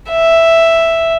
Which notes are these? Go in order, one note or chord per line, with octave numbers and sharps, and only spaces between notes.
E5